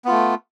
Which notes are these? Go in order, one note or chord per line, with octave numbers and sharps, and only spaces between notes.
A3 B3 F4